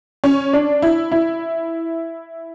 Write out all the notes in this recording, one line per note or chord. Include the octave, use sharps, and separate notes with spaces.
C#4
D4
E4
E4